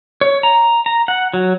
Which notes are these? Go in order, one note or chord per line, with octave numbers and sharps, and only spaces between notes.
C#5
A#5
A#5
F#5
F#3